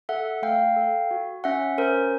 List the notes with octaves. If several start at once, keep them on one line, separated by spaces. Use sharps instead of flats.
A4 E5 F#5
A3 F5 G5
A4
F#4
C#4 E5 F#5
C#4 A#4 C5